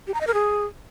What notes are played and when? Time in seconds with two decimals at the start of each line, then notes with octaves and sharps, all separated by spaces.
0.07 G4
0.14 A#5
0.21 D#5
0.27 A#4
0.34 G#4